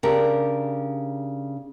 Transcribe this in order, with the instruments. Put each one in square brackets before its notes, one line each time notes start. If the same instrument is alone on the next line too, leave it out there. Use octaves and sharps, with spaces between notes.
[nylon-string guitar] C#3 D4 G4 A#4